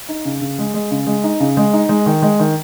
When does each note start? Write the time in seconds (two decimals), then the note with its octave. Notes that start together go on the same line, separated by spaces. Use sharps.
0.09 D#4
0.25 C#3
0.41 C#3
0.58 G#3
0.74 G#3
0.91 C#3
1.07 G#3
1.24 D#4
1.40 C#3
1.57 G#3
1.73 D#4
1.89 G#3
2.06 D#3
2.22 G#3
2.40 D#3